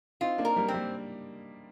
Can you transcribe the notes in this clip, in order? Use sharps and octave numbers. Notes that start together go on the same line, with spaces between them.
C4 D#4 F4
A#3 D4
A#4
G3 A#3
C4
G3 A#3